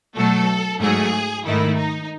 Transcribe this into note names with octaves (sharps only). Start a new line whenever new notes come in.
B2 F#3 A3 A4
G#2 F#3 A3 G#4
G#2 D#3 A3 E4
D#4